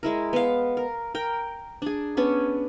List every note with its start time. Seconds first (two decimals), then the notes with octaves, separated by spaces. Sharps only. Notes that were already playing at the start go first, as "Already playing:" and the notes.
0.03 G#3 E4 A#4
0.33 B3 F5
0.77 A#4
1.15 A#4 G5
1.82 D4 G#4
2.17 B3 C#4 D4